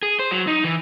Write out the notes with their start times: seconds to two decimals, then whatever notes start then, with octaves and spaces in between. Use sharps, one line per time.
0.03 G#4
0.19 C5
0.31 F#3
0.47 D#4
0.64 E3